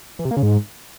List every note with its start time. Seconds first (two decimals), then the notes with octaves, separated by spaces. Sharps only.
0.19 E3
0.25 C3
0.31 A#3
0.37 C#3
0.43 G#2